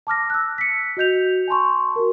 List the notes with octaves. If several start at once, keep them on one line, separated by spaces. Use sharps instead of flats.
A5 D6 F6 A#6
E6 F#6
B6 C#7
F#4 D#5 G6 F7
G#5 A5 C6 C#6
F#4 A#4